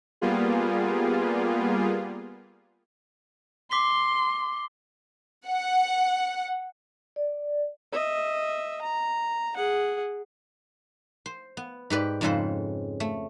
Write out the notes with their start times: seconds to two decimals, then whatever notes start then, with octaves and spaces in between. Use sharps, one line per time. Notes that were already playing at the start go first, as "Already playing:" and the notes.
0.21 G3 A#3 B3 F4 G#4
3.71 C6 D6 B6 G7
5.49 F#5
7.16 D5
7.92 D#5 E5
8.81 A#5
9.56 G#4 F#5
11.26 C5
11.57 B3
11.90 G#2 G4 B4 D5
12.21 F2 G#2 C#3 A4 B4 C5
13.00 A3